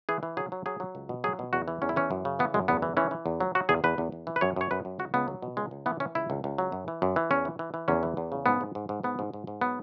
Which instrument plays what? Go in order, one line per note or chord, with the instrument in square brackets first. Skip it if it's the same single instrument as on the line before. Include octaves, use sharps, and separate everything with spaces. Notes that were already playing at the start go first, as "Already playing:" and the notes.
[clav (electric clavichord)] E3 G#4
E3
F#3 G#4
F#3
F#3 G#4
F#3
C#2
B2
F#3 G#4
B2
E2 F#4
E3
E2 C#4
E4
E3 C#4
F#2
C#3
E3 B3
F#2 G#3
E2 B3
E3
E3 C#4
E3
E2
F#3
F#3 F#4
E2 G#4
E2 B4
E2
E2
E3
B4
F#2 C#5
F#2 C#5
F#2 B4
F#2
C#2 F#4
C#2 B3
F#3
B2
C#2 G#3
C#2
E3 B3
E3 C#4
C#2 E4
C#2
C#2
F#3
F#2
E3
F#2
E3
E2 C#4
E3
E3
E3
E2 C#4
E3
E2
C#3
G#2 B3
G#2
G#2
G#2
G#2 B3
G#2
G#2
G#2
F#3 B3